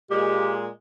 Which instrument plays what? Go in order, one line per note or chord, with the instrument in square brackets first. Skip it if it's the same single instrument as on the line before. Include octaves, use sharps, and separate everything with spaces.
[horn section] A#2 G#3 [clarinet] G4